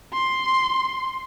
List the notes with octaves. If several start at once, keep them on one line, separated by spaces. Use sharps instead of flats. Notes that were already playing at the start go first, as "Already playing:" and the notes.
C6